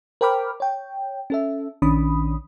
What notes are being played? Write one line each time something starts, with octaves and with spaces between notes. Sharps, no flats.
A#4 C5 G5 B5 D6 F6
C#5 G5
C#4 A4 E5
A#1 D#3 C#4 D4 B5 D#6